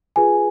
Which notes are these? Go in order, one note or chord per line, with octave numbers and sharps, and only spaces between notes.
F4 G#4 B4 G#5